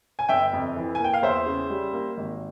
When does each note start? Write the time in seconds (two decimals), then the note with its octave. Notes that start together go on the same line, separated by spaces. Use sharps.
0.19 G#5
0.29 G1 E5 G5
0.53 F2
0.76 E3
0.95 G#5
1.00 A#3 G5
1.14 F5
1.22 E2 C5 E5
1.46 C#3
1.70 G3
1.93 A#3
2.17 G#1